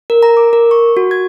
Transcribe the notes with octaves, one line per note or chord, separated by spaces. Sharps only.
A#4
A#5
D6
A#4
C#6
F#4
G#6